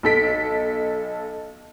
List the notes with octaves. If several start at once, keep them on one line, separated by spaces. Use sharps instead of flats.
B1 A4 B6 D7